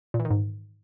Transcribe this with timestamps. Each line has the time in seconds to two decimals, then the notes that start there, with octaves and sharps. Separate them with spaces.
0.14 A#2
0.20 E3
0.25 D#3
0.30 G#2